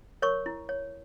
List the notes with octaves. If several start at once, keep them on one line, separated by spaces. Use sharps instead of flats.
A#4 C#5 C#6
E4
C#5